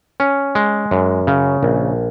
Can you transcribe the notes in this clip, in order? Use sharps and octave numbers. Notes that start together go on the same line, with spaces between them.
C#4
G#3
F#2
C#3
A#1